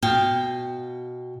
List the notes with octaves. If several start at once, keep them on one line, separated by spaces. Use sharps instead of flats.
B2 F5 G5